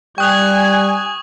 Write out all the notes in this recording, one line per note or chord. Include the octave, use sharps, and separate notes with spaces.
G3 G5 G#5 C#6 D#6 F#6 G#6 F7